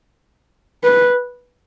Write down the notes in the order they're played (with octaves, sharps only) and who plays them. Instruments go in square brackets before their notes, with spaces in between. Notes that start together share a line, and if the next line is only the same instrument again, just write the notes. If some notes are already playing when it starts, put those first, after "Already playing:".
[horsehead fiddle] B4